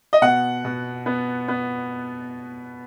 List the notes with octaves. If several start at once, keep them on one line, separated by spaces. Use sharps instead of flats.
D#5
B2 F#5
B2
B3
B3